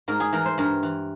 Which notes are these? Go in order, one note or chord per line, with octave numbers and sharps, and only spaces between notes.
G#2 A#4
G#4
E3 A#4
C5
G2 A#4
E3